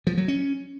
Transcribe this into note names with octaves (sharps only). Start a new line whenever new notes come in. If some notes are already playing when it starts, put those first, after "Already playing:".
F3
F#3
C#4